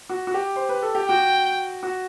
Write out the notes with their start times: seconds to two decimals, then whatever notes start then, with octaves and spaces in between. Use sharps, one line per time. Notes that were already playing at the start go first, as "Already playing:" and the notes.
0.09 F#4
0.27 F#4
0.34 G4
0.56 C5
0.69 B4
0.82 A4
0.95 G4
1.08 F#4 G5
1.83 F#4